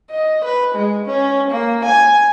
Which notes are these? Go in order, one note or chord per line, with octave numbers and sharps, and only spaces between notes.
D#5
B4
G#3
C#4
A#3
G#5